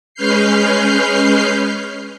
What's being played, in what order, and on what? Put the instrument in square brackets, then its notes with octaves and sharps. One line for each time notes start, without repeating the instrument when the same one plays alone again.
[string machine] G#3 C#4 B4 F6 G6 C7